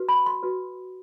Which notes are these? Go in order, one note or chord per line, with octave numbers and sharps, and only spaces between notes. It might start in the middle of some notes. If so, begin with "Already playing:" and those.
Already playing: F#4 B4
B5
C6
F#4 B4